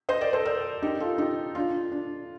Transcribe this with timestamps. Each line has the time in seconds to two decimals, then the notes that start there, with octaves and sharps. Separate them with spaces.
0.09 C5 D#5
0.21 A#4 D5
0.33 A4 C5
0.45 A#4 D5
0.82 D#4 G4
1.00 F4 A4
1.18 D#4 G4
1.55 D4 F4
1.92 D4